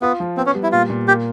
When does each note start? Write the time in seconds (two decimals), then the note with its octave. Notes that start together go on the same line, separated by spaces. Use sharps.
0.02 B3 F4
0.20 F3
0.37 B3 C4
0.46 C#4
0.55 G3
0.63 E4
0.72 A#2 F4
0.90 A#2
1.08 A#3 G4